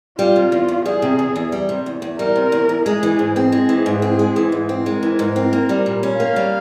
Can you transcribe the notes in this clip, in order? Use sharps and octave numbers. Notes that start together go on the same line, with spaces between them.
G3 F4
C3
E2
E2
G3 G#4
C3
E2
E2
G3
C3
E2
E2
G3 A#4
C3
E2
E2
G#3 G#4
E3
G#2
C4
G#3 G#4
E3
G#2
C4
G#3
E3
G#2
C4
G#3 A#4
E3
G#2
C4
A#3
G3
A#2
C#4
A#3 F5
G3